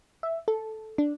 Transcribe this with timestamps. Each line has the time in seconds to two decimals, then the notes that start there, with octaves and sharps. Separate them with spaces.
0.23 E5
0.48 A4
0.98 D4